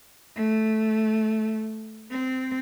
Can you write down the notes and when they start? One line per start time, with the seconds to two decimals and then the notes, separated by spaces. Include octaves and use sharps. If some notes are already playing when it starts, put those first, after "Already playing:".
0.36 A3
2.11 C4